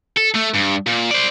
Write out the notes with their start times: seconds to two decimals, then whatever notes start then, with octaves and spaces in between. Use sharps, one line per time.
0.17 A4
0.34 A3
0.54 G2
0.87 A#2
1.11 C5 D5